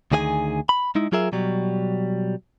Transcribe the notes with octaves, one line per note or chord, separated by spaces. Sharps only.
D2 D#3 G#4 D5 G#5
B5
G#3 D#4 E4
F#3 F4 G#4 A#4 E5
B2 F#3 G3